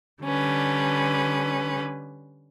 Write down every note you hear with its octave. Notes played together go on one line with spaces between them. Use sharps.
D3 G3 C#4 B4